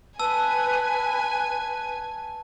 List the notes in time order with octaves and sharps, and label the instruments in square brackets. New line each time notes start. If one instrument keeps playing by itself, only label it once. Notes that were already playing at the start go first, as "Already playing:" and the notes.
[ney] B4 [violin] G#5 [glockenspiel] A5 E6